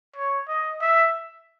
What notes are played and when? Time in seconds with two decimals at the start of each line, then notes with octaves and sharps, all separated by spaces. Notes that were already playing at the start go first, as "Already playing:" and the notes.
0.16 C#5
0.48 D#5
0.81 E5